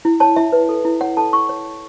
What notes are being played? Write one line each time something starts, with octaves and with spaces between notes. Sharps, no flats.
E4
C#5 A5
E4 E5
B4
A4
E4
C#5 F#5
A4 A5
E4 C#6
C#5
C#5